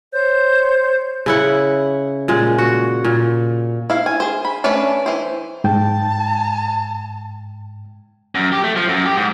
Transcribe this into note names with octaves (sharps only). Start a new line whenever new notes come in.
C5 C#5 G6
C#3 E4 F#5
A#2 G#3
F#4
A#2
E4 F5
G#5
G#4 C5
B5
A3 C#4 D4 B4 D5
E3 C5
G#2 G5 A5
F#2
G4
A3
F3
F#2
G4
G#2